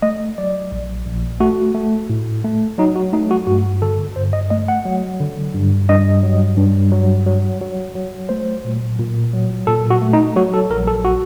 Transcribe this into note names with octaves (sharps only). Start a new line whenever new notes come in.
A3 D#5
F#3 D5
A#1
A#1
A3 F#4
A3
A2
A3
F#3 D#4
F#4
A3 D#4
F#4
G2 F#4
D3 A4
G2 C5
D#5
A3 D#5
F#5
F#3
D3
G2
G2 D#5
F#3
G2
F#3
F#3
F#3
F#3
A3 C5
A#2
A#2
F#3
A#2 A4
F#4
A3
D#4
F#3 F#4
A4
A#1 A#4
A4
F#4